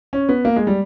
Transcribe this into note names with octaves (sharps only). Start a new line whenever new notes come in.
C#4
B3
A#3
G#3
G3